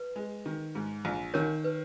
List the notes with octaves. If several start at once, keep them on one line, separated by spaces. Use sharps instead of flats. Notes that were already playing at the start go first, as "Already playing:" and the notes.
Already playing: B4
G#3
D#3
G#2
A#1
D#3 A#4 C#5
B4